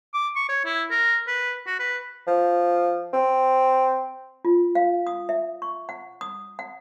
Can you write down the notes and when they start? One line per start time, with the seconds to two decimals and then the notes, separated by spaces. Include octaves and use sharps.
0.14 D6
0.36 C#6
0.49 C#5
0.65 E4
0.91 A#4
1.27 B4
1.67 F#4
1.80 B4
2.27 F3
3.13 C4
4.45 F4
4.75 F5
5.07 D#6
5.29 E5
5.62 C#6
5.89 F#5
6.21 D#6
6.59 F#5